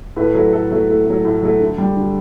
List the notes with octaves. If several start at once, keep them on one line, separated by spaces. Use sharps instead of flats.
A2 B4
F#3 A3
A2 A4
F#3 A3
A2
F#3 A3
A2
F#3 A3
D3
G3
D3